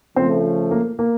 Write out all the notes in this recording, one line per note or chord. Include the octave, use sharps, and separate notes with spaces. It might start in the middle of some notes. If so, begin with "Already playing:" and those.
C#3 F3 A3 C4 C5
A#3 A#4
A#3 A#4